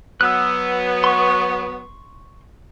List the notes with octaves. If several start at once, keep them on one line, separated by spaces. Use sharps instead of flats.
F#3 B3 E6 F#6
C6 C#6